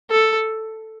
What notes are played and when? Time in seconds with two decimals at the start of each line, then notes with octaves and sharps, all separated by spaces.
0.11 A4